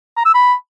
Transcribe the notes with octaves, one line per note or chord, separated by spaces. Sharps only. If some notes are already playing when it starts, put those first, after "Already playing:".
A#5
E6
B5